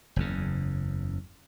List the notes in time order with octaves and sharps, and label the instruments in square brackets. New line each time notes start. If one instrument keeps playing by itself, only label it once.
[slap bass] F#1 E2 C#3